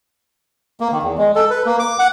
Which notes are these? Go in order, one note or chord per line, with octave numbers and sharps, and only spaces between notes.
A#3
D#3
E2
G#3
A4
B4
A#3
D6
F#5